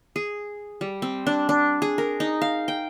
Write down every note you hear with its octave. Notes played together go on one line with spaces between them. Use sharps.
G#4
G3
C4
D4
D4
G#4
A#4
D#4
F5
G5